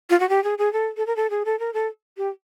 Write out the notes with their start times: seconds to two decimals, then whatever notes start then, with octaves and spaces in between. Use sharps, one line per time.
0.10 F4
0.20 F#4
0.29 G4
0.44 G#4
0.58 G#4
0.73 A4
0.97 A4
1.07 A#4
1.16 A4
1.30 G#4
1.45 A4
1.59 A#4
1.74 A4
2.17 G4